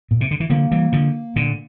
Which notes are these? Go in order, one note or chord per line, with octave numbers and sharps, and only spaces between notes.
A#2
C3
D3
E3
D3 F3 A#3
E3 G3
D3 F3
A#2 D3